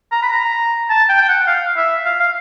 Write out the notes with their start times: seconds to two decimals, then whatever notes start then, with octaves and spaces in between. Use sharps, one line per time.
0.12 A#5
0.23 B5
0.32 A#5
0.90 A5
1.09 G5
1.22 G5
1.29 F#5
1.47 F5
1.77 E5
2.06 F5
2.20 F5